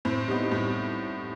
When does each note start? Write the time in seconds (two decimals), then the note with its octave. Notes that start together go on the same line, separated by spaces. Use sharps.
0.05 A2 C4
0.28 G3 B3 D#4
0.51 A2 G3